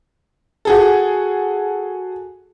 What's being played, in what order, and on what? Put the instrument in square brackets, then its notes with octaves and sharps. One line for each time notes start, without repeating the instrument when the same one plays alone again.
[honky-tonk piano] F#4 G#4 A4